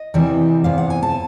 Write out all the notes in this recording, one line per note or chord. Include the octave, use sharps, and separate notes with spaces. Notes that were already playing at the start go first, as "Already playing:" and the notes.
Already playing: D#5
E2 C3 E3 G3
E2 C3 F5
F#5
G#5
A5